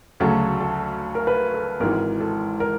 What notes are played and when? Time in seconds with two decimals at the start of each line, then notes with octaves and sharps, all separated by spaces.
0.20 D2 C#3 F#3 A3 C#4 A4
0.60 A4
1.15 A#4
1.27 B4
1.54 A4
1.80 G#1 G#2 E3 A#4
2.20 A4
2.60 A#4